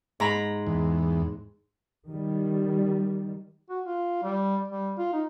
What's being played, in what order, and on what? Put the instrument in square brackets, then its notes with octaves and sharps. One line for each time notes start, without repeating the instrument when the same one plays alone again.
[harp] G#2 A#5 B5
[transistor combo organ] E2
[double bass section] D#3 G3
[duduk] F#4
F4
G3
G3
F4
D#4